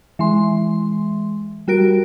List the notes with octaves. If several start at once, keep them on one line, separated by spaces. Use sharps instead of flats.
E3 G#3 C6
G3 F#4 A#4 D7